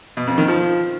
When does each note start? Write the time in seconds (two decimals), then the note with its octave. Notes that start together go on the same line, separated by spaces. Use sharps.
0.17 B2
0.27 F2
0.38 D#3
0.48 F3